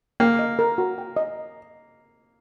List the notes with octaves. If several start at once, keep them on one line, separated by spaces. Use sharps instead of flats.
A#3 G5
D#5
A#4
F#4
G5
D#5